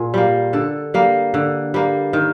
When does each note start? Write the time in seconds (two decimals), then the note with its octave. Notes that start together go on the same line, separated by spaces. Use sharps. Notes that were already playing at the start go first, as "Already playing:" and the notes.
Already playing: A#2 G#4
0.14 G3 A#3
0.53 D3 A4
0.94 G3 A#3
1.34 D3
1.74 G3 A#3
2.13 D#3